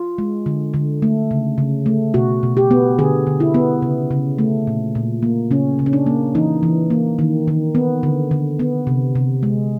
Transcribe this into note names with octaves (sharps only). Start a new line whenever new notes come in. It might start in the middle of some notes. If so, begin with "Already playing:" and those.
Already playing: F4
G#3
D3
D3
A3
C#3
C#3
A3
B2 F#4
B2
G4
B3
D3 G#4
D3
E4
B3
C#3
C#3
A3
A#2
A#2
A#3
C#3 C#4
C#3
C#4
D4
A#3
E3 D#4
E3
A#3
D#3
D#3
B3
D3
D3
B3
C3
C3
G#3